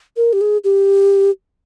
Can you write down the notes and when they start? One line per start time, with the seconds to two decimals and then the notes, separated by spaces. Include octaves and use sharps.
0.17 A#4
0.33 G4
0.41 G#4
0.64 G4